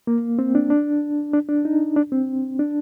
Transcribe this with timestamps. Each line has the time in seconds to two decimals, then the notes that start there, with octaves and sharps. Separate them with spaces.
0.07 A#3
0.39 C4
0.55 D4
0.70 D4
1.34 D4
1.49 D4
1.65 D#4
1.96 D4
2.12 C4
2.59 D4